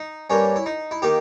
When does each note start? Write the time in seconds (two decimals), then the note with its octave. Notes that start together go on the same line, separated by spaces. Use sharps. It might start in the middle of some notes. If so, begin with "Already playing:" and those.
Already playing: D#4
0.30 G2 G3 A#3 C#4
0.56 E4
0.66 D#4
0.91 E4
1.02 D#3 A#3 G4